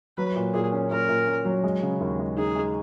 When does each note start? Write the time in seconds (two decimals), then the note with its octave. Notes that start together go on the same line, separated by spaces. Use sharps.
0.17 F#3 B4
0.36 A#2
0.54 A#2 G#4
0.72 C#4
0.91 A#2 A#4
1.09 A#2
1.27 C#4
1.45 F#3
1.63 G#3
1.82 C#3
2.00 D#2
2.19 G#3
2.37 D#4 G#4
2.55 G#3